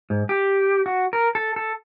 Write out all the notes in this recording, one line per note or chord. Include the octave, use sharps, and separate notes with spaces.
G#2
G4
F#4
A#4
A4
A4